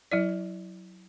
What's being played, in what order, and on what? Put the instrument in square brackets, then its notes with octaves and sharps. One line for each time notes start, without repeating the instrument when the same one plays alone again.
[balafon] F#3 E4 D5